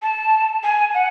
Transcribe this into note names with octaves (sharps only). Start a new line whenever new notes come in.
A5
G#5
F#5